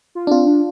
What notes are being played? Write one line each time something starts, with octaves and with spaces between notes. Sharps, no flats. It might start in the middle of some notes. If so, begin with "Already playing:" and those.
F4
D4
C4 F4
D4